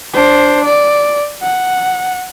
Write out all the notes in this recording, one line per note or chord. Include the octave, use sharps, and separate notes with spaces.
D4 C5
D5
F#5